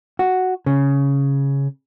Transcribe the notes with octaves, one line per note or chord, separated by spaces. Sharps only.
F#4
C#3